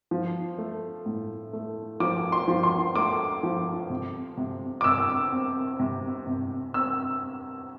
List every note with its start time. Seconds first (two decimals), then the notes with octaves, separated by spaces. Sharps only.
0.11 F3
0.58 A3
1.06 A2
1.53 A3
2.00 F3 D6
2.32 C6
2.48 F3
2.63 C6
2.96 A3 D6
3.43 F3
3.90 C3
4.38 C3
4.81 D6
4.84 C3 E6
5.32 C4
5.80 C3
6.27 C3
6.74 C4 E6